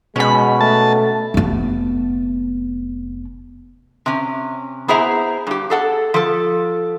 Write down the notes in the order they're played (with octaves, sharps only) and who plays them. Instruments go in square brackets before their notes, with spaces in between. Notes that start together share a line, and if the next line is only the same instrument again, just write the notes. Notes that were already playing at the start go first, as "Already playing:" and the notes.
[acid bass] B2 [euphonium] G#3 [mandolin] C#4 B5
[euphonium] A3 [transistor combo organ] A5
[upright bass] F1 B3
[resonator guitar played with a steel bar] C3 C#4
B3 E4 G#4 C5 E5 A#5
G2 G4
G#4 A4 F#5
F3 A4